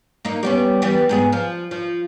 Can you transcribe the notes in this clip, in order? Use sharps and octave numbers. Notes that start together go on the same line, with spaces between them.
A#3 D#4
G3 B3 C#4
E3 G3 B3
G#2 B3 G#4
F3
F3